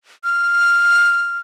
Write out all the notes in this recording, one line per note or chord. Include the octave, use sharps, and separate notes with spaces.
F6